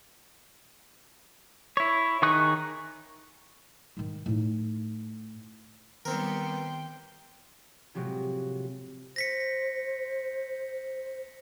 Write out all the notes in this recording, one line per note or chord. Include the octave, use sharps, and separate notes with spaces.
E4 C#5
D#3 D#4 G#4 C#6 F#6
G#2 D#3
A2 D#4
D#3 G3 B3 C4 A#4 G5 C6
A2 C3 F3 F#3 G#3
C5 A#6 B6 C#7